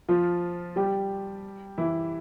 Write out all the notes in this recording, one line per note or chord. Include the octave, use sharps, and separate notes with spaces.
F3 F4
G3 G4
E3 E4